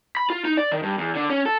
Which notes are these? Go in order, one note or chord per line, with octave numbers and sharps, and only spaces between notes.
B5
F4
D#4
D5
D#3
G2
E2
D3
C#4
A4